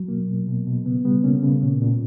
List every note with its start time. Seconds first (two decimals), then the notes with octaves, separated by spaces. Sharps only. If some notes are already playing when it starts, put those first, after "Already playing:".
Already playing: F#3
0.08 B2 A#3
0.28 B2
0.48 B2
0.66 B2
0.85 C#3 B3
1.05 G3 B3
1.24 C#3 A#3 C#4
1.43 C#3
1.63 A#2
1.82 A#2